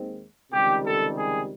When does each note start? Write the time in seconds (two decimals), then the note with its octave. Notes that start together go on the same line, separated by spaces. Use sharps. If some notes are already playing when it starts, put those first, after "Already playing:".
Already playing: D#2 D#3 G#3 C4
0.52 C#2 C3 D#3 G3 G4
0.85 A4
1.17 G#4